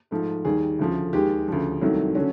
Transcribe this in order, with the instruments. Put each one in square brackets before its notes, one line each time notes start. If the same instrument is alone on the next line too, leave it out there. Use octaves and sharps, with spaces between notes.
[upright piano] G#2 F3 A3
D#2 D#3 G3 G#4
D2 C#3 F3 A3
D#2 D#3 G#3 G4
D2 C#3 F3
C2 C3 D#3 F#3 A3
D3 F#3 A3 C#4